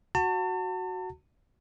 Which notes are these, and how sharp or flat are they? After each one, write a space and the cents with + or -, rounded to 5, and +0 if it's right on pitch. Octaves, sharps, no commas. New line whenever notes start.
F#4 +0 A5 +35